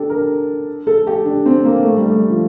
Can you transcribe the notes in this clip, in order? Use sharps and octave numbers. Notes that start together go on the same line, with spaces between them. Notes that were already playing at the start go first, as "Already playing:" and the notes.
Already playing: D4 G4 A4
A#4
A4
G4
D4
C4
A#3
A3
G3
A3
F3